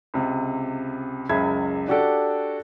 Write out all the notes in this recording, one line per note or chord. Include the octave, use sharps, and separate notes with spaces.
C#2 C3
F#1 C#2 G#4 E5 B5 G#6
D4 F#4 G4 A4 D5